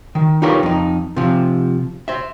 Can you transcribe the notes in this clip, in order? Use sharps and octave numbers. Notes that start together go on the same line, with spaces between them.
D#3
D#4 F4 G4 A#4 B4 C#5
F2 D#4
C3 F3
C5 E5